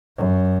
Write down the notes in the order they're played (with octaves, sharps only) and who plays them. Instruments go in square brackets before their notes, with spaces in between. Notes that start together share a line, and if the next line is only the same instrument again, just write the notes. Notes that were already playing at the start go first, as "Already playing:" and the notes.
[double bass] F#2